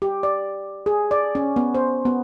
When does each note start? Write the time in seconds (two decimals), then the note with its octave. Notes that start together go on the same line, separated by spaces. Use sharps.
0.02 G4
0.23 D5
0.86 G#4
1.11 D5
1.35 C#4
1.56 B3
1.75 C5
2.05 B3